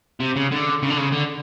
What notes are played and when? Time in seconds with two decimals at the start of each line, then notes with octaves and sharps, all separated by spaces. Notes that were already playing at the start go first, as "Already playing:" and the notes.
0.20 C3
0.35 C#3
0.51 D3
0.83 C#3
0.90 D3
0.98 C#3
1.13 D3